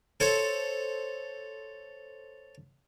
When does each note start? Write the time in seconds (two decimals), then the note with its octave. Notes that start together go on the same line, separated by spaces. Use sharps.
0.20 A4 C5 C#5